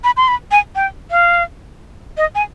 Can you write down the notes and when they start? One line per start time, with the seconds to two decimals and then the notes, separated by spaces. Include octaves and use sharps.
0.04 B5
0.17 C6
0.28 B5
0.51 G#5
0.76 G5
1.11 F5
2.17 D#5
2.35 G#5